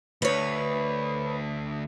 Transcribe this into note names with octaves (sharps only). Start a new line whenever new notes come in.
D2 B4 C#5